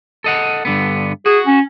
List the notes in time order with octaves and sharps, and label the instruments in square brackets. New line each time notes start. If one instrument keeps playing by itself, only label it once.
[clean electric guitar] A4 D#5 F#5
G2 D3 B3
[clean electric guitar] F#4 [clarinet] G#4
[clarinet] C#4